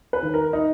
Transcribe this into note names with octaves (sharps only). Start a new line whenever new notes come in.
B4
D#3
A#4
D#4